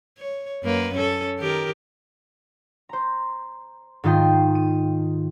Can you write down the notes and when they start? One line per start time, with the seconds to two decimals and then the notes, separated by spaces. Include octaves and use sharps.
0.18 C#5
0.62 F#2 A#3 B4
0.94 C#4 A4
1.38 D#3 G4 A#4
2.89 C5 A#5
4.04 G#2 D#3 F4 D#5 G5 C7
4.55 D#7